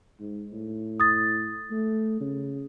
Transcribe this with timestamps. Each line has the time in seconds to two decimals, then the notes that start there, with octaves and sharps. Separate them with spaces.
0.20 G#2
0.52 A2
1.00 D#6 A6
1.71 A3
2.21 C#3